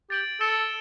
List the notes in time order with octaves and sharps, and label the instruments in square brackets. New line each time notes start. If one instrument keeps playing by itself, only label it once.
[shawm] G4 [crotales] A6 D7 F#7
[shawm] A4 [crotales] E6 A6 C#7 E7 G7